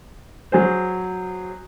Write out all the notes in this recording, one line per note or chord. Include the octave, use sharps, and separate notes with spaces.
F#3 G#4 C5